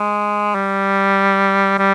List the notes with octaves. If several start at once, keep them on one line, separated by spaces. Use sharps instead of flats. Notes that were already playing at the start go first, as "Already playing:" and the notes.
Already playing: G#3
G3
G3